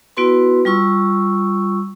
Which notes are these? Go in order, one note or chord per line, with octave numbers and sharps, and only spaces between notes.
B3 E4 F#4 B4 C6
G3 F4 C#6 E6